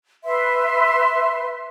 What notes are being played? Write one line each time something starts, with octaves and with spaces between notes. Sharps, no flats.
B4 E5 C6